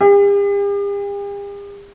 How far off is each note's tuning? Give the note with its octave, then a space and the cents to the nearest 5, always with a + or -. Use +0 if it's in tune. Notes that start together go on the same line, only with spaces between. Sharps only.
G4 +45